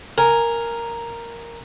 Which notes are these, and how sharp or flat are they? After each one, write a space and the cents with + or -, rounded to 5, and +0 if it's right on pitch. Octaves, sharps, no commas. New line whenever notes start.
A#4 +0 G#5 +0